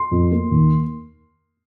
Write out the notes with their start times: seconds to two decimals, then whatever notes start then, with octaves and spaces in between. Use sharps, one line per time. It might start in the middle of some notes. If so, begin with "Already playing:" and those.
Already playing: C6
0.11 F2
0.32 A#3
0.51 D#2